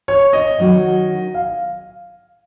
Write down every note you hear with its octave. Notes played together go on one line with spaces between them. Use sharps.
C#5
D#5
D#3 F#3 C#4 F#4
F5